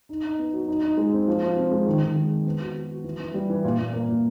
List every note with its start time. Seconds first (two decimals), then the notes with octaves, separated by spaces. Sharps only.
0.09 D#4
0.24 D#4
0.38 B3
0.53 F#3
0.68 D#4
0.83 D#4
0.97 G#3
1.12 C4
1.28 F3
1.43 F3
1.56 C3
1.71 G#3
1.87 D#3
2.01 D#3
2.16 G#3
2.30 C4
2.45 B3
2.61 F#4
2.75 F#4
2.90 F#4
3.04 E3
3.20 E3
3.34 G3
3.50 E3
3.64 A#2
3.78 A#2
3.93 A#3
4.08 A#2